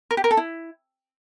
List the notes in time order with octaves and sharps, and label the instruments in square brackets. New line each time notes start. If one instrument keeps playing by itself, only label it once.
[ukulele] A#4
G4
A#4
A4
E4